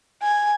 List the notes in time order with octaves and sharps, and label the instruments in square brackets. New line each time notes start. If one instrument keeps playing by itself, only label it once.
[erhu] G#5